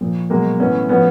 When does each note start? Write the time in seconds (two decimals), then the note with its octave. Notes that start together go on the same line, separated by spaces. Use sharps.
0.01 A#2 F3
0.30 B2 F#3 G#3 A#3
0.59 A2 E3 B3 C#4
0.89 A2 F3 B3 C#4